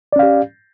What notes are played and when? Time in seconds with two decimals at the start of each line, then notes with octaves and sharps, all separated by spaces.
0.13 D5
0.16 C#4
0.19 F5
0.23 G4